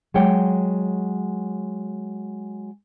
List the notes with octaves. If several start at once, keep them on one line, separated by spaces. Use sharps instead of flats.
F#3 G#3 C#5 G5